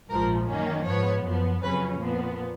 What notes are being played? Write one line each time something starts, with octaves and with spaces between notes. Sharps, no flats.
A#1 G#2 F3 A#4
F#2 D#3 A#3 C#4
G#2 F3 B3 C#5
F#2 F3 B3
F2 C#3 F#3 C#4 B4
A#2 F3 B3